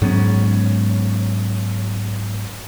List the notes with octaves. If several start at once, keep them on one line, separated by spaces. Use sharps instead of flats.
G#2 F#3 B3 C#4